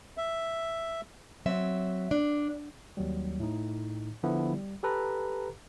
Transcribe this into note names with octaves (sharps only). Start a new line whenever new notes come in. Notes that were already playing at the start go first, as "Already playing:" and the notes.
E5
F#3 C4 E5
D4
D#2 F#3 G3
A2 D#4
D3 F3 B3 E4
G3
G4 A4 B4 A#5